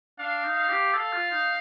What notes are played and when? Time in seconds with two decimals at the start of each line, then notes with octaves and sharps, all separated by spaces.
0.19 D4 F5
0.44 D#4
0.56 F5
0.69 G4
0.94 A4 F5
1.13 F4
1.31 D#4